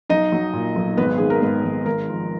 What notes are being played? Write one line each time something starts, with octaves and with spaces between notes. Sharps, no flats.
B1 D#4 D#5
F#3
A#2
B1
G#1 B3 B4
D#3 G#4
A#4
G#2 B3 B4
G#1
G#1 A#4
F3